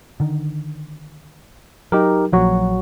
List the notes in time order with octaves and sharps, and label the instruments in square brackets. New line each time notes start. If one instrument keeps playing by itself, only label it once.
[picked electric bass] D3 D#3
[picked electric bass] F#3 [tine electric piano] D#4 G4 A#4
[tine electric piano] A#1 F#3 F#4 [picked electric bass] F3 A#3